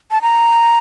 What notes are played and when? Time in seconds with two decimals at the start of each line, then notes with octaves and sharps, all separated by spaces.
0.11 A5
0.22 A#5